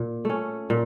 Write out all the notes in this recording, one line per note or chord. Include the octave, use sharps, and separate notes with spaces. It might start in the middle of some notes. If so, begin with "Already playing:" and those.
Already playing: A#2
A3 C#4
A#2